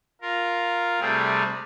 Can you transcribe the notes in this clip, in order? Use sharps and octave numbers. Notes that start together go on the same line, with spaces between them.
F4 A#4
C3 G3 A3 C4 G#4